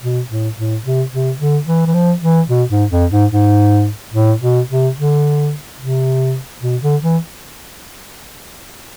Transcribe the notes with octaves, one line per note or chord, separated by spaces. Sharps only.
B2
A2
A2
C3
C3
D3
E3
E3
F3
E3
B2
G#2
F2
G#2
G#2
A2
B2
C3
D3
C3
B2
D3
E3